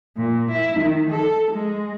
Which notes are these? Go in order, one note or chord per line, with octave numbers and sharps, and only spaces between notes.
A#2
E4
D#3
A4
G#3